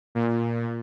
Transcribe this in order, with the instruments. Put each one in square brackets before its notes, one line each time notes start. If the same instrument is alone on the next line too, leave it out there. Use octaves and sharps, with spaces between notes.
[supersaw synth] A#2